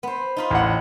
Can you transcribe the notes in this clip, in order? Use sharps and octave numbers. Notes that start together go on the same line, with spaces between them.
B3 C5
D#4 F4 B5
A1 F#5